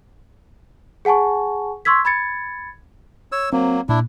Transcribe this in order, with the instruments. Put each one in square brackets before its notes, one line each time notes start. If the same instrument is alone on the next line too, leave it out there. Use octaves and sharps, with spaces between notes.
[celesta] G#4 F#5 G#5 A5 C#6
C6 C#6 E6 G#6 B6
B5 G#6 A6 C#7
[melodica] C#5 E6
[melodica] F#3 A#3 [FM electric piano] C4
[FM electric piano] A#2 [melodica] D4 E4